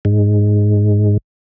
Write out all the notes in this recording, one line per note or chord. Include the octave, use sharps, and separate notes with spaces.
G#2